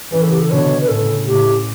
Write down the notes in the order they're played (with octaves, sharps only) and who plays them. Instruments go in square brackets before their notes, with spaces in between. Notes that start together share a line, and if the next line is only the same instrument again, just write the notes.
[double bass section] C#3 E3 [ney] B4
[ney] A4
G4
A4
[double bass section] B2 D3 [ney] C#5
[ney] B4
[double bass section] A2 C#3 [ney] A4
[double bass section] A2 C#3 [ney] G4